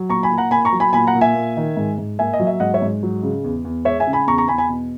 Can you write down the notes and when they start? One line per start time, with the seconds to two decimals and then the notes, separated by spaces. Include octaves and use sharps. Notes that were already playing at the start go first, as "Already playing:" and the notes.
Already playing: F#3
0.09 A#2 A#5 C#6
0.23 G#5 B5
0.31 A#2
0.38 F#5 A#5
0.51 A#3 G#5 B5
0.65 A#5 C#6
0.73 F#3
0.80 G#5 B5
0.93 A#2 G#5 B5
1.07 F#5 A#5
1.15 A#2
1.21 E5 G#5
1.35 A#3
1.57 D#3
1.77 G#2
1.98 G#2
2.19 A#3 E5 G#5
2.33 D#5
2.40 F#3
2.47 E5
2.60 G#2 D#5 F#5
2.74 C#5 E5
2.82 G#2
3.03 F#3
3.23 C#3
3.44 E2
3.65 E2
3.85 G#3 C#5 E5
4.00 E5 G#5
4.07 C#3
4.13 G#5 B5
4.27 E2 A#5 C#6
4.38 A#5 C#6
4.48 E2 G#5 B5
4.58 G#5 B5
4.69 B2